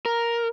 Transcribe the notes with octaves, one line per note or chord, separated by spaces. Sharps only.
A#4